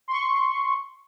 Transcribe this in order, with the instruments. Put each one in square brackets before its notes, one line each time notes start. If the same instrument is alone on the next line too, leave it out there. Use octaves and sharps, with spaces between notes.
[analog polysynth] C6 C#6